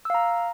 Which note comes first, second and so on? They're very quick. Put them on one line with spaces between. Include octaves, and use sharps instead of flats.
E6 F5 A#5